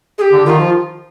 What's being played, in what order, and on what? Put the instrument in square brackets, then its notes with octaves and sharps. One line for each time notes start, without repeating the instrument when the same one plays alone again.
[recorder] G#4
G4
[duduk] D3
[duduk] D#3 [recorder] F4
[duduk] F3